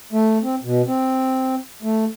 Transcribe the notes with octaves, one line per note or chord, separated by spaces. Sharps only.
A3
C4
B2
C4
A3